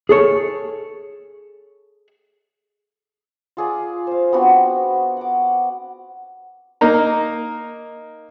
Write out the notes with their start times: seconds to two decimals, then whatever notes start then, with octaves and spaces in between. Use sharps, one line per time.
0.09 G#4 A4 C#5
3.57 F4 G#4 D5
4.07 C5 F5
4.33 B3 C4 D4 F#4
5.17 F#5 D6
6.81 A#3 D#4 A#5